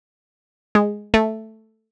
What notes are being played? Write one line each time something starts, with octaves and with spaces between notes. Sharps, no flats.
G#3
A3